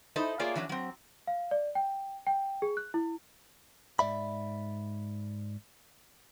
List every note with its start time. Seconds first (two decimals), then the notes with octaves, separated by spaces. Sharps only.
0.16 D#4 E4 A4 C5 D#5
0.39 A3 A#3 F4 G#4 C#5 D5
0.55 E3 F#3 A3 C#4 D4
0.69 F#3 C4
1.27 F5
1.51 D5
1.75 G5
2.27 G5
2.62 G#4
2.77 F#6
2.94 E4
3.99 G#2 D5 E5 B5